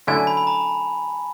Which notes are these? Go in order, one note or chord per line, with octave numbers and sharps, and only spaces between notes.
D3 F#3 A3 C#4 E4 G#5
A5
B5
B5
A#5